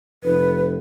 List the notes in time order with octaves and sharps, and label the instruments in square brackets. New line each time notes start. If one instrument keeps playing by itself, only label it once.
[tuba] F1 [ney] B4